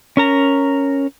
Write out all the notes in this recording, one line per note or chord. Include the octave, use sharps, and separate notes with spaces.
C#4 A#4 A#5